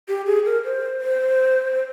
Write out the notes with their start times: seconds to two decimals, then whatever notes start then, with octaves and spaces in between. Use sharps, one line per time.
0.08 G4
0.26 G#4
0.45 A#4
0.64 C5
1.01 C5